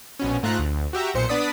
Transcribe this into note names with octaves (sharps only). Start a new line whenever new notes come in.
A#1 B2 C#4
G#2 A3 F4 A#5 F#6
D2
F#4 G4 E5 A#5
B1 A#2 C5 C#7
B3 D4 D5 D#6 B6